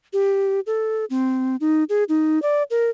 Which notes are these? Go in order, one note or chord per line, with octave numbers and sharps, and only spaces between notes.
G4
A4
C4
D#4
G#4
D#4
D5
A#4